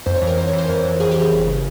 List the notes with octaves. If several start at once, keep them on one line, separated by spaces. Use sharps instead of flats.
F2 C5
C#5
E3
A#4
F2 C5
C#5
E3
C5
F2 A#4
E3
F2 G#4
G4
E3
G#4
G1
C#3